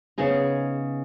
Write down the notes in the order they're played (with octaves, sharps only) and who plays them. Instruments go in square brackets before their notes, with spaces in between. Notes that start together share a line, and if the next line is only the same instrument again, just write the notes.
[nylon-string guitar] C#3 B3 D#4 G#4